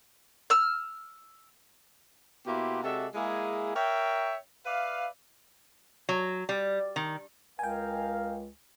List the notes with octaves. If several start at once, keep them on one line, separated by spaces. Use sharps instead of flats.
E6 F6
B2 A#3 E4 G4 F#5 C6
C3 G#3 F#4 A4 D5 E5
G#3 A#3 E4 G#4
A#4 C#5 E5 G5
B4 D5 E5 F5
F#3
G3
D#3
C#2 A#4 D#5 F5 G5 G#5